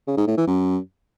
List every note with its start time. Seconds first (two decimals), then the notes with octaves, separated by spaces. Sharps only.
0.08 C#3
0.18 G#2
0.28 A2
0.37 E3
0.47 F#2